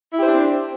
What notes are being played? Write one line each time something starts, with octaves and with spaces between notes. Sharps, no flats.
C4 D4 E4 G4 C5